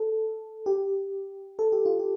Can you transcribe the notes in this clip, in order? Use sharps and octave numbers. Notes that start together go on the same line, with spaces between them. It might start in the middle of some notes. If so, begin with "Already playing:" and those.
Already playing: A4
G4
A4
G4
F4
G4